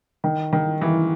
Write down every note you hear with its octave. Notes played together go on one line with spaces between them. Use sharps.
D#3
D#3
E3